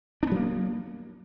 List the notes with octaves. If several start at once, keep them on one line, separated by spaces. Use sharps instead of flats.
F#3 A#3 B3 D4